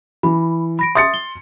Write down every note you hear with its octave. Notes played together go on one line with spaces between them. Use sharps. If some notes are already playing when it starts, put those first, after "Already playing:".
E3 B5
B5 A#6 D7
E5 C6 D#6 A6 C#7
G7